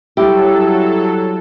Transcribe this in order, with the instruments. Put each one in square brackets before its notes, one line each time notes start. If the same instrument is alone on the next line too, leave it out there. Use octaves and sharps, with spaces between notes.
[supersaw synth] F#3 A4 [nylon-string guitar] G3 G4 [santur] E4